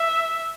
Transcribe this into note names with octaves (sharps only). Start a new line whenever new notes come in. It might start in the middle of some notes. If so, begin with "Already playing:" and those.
Already playing: E5